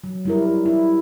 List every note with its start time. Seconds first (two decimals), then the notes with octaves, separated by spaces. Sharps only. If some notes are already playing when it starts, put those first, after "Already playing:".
0.04 F#3
0.25 G3 E4 A#4
0.66 E4